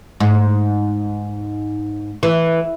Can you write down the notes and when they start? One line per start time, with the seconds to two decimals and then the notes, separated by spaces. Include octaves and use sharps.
0.20 G#2
2.23 E3